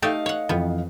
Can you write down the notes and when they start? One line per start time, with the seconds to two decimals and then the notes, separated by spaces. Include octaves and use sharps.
0.02 A3 D#4 G4 A4 D#5 F5
0.26 C#5 F#5
0.49 F2 E3 F3 B3